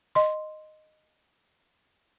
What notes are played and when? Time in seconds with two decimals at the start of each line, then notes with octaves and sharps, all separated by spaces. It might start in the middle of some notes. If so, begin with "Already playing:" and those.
0.15 D#5 C6